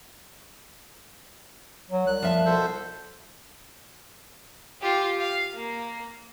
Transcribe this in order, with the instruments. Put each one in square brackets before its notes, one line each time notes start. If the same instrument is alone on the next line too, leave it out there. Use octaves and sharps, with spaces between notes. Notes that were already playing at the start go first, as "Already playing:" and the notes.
[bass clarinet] F#3
[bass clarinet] C2 [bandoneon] F#6
[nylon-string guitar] F3 E5 A5
[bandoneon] B2 A4 C5
[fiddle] F4 G4
F5
A#3